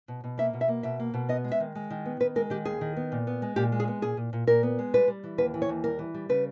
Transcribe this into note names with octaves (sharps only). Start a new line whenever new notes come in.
B2
B2
A#3 E5
B2
E5
A#3
B2 E5
A#3
B2
B3 D#5
G#3
E5
D#3
G#3
D#3
B3
D#3 B4
G#3 A#4
D#3 G4
D#2 G#4
D#3
B3
A#2
B3
G#3
A#2 G4
G#3
G#4
B3
A#2 G#4
A#2
A#2
A#2 A#4
B3
G#3
G3 B4
G3
E3
D#2 B4
E3
C#5
D#2
G3 A#4
E3
G3
C#3 B4